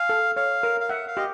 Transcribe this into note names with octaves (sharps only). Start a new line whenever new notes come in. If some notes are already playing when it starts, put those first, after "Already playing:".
Already playing: F5 G#5
A4
C#5 F5
A#4
F5
E5 F#5
F5
G4 D#5